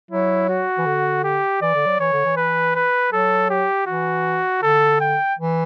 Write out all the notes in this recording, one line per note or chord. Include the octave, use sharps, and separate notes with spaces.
F#3 E4
F#4
E3
D3
G4
E3 D5
D3
F#3
E3 C#5
D3
E3
B4
B4
F#3 A4
G4
E3 F#4
D3 A4
G5
E3